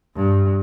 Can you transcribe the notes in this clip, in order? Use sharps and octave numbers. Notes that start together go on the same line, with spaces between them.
G2